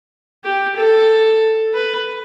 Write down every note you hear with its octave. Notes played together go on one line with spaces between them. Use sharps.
G4
A4
B4